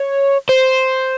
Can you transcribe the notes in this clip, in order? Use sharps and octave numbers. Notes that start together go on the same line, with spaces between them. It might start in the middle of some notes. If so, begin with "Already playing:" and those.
Already playing: C#5
C5